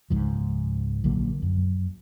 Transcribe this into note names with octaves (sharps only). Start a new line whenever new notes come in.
C#2 G#2 F3
A#1 D3 F#3 A#3
F#2